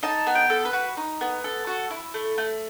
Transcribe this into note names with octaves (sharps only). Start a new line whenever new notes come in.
D#4 A5
B3
G5
A4
B4
F#4
D#4
B3
A4
F#4
E4
A3
A3